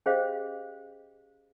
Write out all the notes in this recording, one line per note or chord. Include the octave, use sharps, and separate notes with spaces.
C#4 G4 G#4 C5 D#5 F5